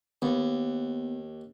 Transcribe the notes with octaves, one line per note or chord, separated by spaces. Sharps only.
D#2 B3